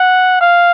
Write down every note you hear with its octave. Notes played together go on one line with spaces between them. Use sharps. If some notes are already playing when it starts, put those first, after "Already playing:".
Already playing: F#5
F5